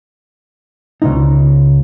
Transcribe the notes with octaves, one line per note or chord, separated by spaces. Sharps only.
C#2 G#2 D#4